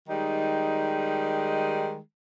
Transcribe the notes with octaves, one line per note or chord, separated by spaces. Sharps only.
D#3 G3 G#3 D#4